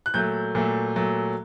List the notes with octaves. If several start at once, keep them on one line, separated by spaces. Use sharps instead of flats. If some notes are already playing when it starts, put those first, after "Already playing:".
F#6
A#2 F#3 A3 G6
A#2 F#3 A3
A#2 F#3 A3